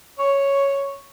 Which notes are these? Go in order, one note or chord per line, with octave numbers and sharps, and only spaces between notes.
C#5